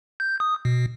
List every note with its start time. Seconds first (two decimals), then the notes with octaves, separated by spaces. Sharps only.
0.20 G6
0.40 D#6
0.65 B2